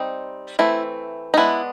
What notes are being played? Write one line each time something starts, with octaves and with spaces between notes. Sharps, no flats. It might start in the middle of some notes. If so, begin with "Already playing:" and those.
Already playing: G3 C4 D#4
E3 A3 C4 E4
D#4
G#3 B3 D4 E4